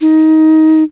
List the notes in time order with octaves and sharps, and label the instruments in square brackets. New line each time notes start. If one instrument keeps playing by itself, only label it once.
[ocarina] D#4